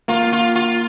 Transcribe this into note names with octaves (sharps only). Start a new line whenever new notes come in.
A#3 F4
F4
F4